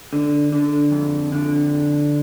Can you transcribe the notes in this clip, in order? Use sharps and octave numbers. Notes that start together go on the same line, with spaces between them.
D3
D3
F2
D3